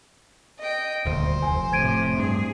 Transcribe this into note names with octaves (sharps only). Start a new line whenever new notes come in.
D#5 G5
D#1 D2 C5
F1 G#5
A2 C3 G#6 D7 D#7
G2 G#4